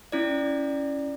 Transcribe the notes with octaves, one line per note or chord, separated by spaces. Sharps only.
C#4 E4 D5